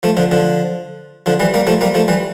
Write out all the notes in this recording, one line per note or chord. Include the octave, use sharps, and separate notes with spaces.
F3 A3
D3 F3
D3 F3
D3 F3
E3 G3
G3 A#3
F3 A3
G3 A#3
F3 A3
E3 G3